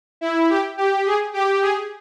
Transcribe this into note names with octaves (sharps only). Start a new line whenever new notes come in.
E4
G4
G4
G#4
G4
G#4